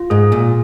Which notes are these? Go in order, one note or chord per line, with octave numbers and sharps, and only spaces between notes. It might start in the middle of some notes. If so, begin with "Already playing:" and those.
Already playing: F4
G#2 G#4
A#2